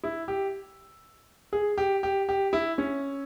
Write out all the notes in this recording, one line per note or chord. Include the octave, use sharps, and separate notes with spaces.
E4
G4
G#4
G4
G4
G4
E4
C#4